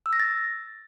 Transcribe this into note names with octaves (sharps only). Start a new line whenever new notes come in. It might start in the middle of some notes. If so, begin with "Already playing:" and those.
E6
A#6
A6